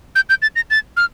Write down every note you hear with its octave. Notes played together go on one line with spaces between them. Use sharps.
G6
G6
A6
A#6
A6
F6